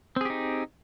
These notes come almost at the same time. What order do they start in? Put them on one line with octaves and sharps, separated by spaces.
C4 G#4 G4 D#4